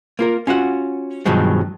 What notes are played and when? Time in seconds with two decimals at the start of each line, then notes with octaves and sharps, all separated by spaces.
0.19 A#3 F4 A#4
0.47 C#4 F4 F#4 F#5
1.26 G2 B2 D#3 F3 F#3 G#3